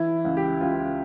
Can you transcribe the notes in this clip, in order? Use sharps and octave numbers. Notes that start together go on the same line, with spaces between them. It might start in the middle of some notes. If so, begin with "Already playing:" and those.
Already playing: E3 E4
C#2
G4
C#2 F4